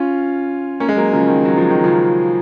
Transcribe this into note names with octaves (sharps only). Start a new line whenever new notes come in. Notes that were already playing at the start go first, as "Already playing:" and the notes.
Already playing: C#4 F4
A#3 C#4
G#3
F#3 A#3
C#3 F3
D#3
F#3
F3
D#3
C#3 F3